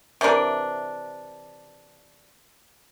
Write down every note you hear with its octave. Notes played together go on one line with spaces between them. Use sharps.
C3 E3 D4 A#4